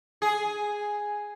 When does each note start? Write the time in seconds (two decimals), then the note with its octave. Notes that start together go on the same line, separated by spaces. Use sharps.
0.22 G#4